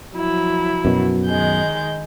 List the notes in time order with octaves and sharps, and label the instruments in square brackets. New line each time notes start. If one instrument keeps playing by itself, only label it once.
[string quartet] F3 F#3 E4
[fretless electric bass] F#2 B2
[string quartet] D#3 G#3 G6